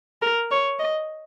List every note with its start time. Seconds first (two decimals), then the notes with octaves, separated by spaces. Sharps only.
0.22 A#4
0.51 C#5
0.79 D#5